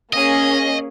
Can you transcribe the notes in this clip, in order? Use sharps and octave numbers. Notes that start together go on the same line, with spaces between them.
A#3 C#4 G#4 D#5